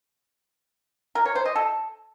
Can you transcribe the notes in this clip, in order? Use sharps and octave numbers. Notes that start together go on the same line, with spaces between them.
A#4
C#5
C5
D#5
A4